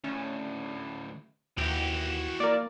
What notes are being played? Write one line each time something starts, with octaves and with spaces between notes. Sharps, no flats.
D2 A2 C#4
D#2 E3 E4 F#4 G5
A#3 A#4 D5